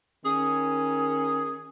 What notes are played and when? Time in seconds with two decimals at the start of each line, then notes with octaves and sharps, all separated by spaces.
0.25 D#3 C#4 G#4